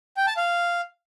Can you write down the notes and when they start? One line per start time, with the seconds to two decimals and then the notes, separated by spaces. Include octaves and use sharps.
0.17 G5
0.27 A5
0.37 F5